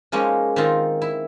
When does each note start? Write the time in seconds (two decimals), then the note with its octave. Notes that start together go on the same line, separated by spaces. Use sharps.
0.12 F3 G#3 A#3 C#4 D#4
0.56 D#3 C4 D#4 F4
1.02 E4